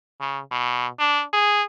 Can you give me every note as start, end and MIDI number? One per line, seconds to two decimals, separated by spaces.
0.20 0.40 49
0.51 0.87 47
1.00 1.23 62
1.33 1.63 68